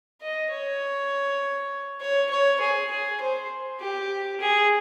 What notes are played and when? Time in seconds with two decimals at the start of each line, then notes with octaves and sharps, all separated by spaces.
0.22 D#5
0.51 C#5
2.01 C#5
2.31 C#5
2.61 G#4
2.91 G#4
3.21 C5
3.81 G4
4.41 G#4